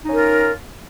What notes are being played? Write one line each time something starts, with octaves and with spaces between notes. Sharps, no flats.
C#4 D#4 F4 A#4